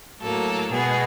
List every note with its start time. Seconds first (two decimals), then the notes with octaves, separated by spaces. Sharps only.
0.21 A2 F#3 A#3 A4
0.71 B2 G#3 B3 G#4